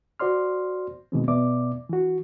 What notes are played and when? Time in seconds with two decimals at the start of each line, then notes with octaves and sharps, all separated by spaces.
0.20 F#4 C5 D5 C6 F6
1.12 B2 D#3 E3 G#3 A#3 C4
1.28 B2 B3 D5 E5 D6
1.90 E3 F#4